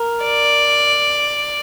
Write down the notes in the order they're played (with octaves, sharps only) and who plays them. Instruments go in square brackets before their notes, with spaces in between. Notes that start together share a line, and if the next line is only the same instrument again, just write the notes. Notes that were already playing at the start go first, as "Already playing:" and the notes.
Already playing: [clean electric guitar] A#4
[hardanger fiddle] D5